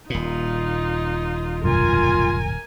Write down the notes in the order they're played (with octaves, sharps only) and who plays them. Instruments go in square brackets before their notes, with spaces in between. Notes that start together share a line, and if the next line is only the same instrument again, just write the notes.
[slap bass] D#1 A#2 [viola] D#4 F4
[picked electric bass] F1 B1 G2 [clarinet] F4 [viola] A#4 G#5